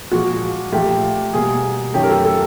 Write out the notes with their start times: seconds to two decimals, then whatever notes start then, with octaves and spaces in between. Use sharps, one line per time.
0.12 A#2 F3 G#3 F#4
0.72 A#2 F3 A3 G4
1.33 B2 G3 A#3 G#4
1.94 F#2 D#3 F#3 A3 G4
2.03 A#4
2.09 A4
2.25 A4